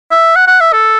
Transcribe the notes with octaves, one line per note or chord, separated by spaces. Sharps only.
E5
F#5
F#5
E5
A4